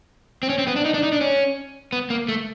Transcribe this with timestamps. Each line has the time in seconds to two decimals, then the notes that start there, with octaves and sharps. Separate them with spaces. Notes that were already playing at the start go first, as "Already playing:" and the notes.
0.43 C4
0.49 C#4
0.58 C4
0.67 B3
0.76 D4
0.85 D#4
0.94 D4
1.03 D#4
1.12 D4
1.21 C#4
1.92 B3
2.10 A#3
2.29 A3